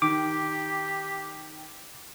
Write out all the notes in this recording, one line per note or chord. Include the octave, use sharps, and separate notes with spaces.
D#3 G4 D6